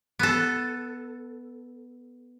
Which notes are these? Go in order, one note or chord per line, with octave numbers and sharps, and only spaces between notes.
B3 A4